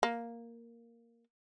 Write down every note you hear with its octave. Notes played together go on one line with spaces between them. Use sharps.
A#3